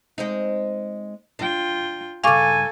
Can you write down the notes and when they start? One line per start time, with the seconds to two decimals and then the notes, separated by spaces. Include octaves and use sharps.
0.18 G#3 C4 D#4
1.39 D4 F4 G5
2.24 G2 C#3 A4 F5 G#5 C#6 D6